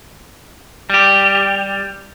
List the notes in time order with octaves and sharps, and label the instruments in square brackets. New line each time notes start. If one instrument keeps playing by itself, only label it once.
[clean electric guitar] G3 G4